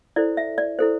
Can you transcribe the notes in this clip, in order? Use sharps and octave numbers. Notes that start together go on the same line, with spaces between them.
E4 A4 C5 D5
E5
D5
E4 A4 C5